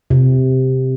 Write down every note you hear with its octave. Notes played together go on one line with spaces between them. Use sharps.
C3